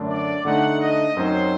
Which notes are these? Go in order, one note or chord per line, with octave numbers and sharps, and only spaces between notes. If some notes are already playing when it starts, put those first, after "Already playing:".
Already playing: F#2 D3 A3 D4
D5
D3 A3 D#4 F#5
D#5
F#2 F#3 C4 D#4 C5